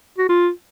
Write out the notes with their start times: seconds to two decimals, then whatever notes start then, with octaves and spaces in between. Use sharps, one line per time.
0.18 F#4
0.29 F4